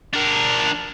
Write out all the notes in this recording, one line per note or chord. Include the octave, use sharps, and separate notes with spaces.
D4 A#4